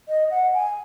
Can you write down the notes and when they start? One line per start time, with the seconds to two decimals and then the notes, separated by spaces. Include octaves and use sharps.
0.08 D#5
0.31 F#5
0.54 G#5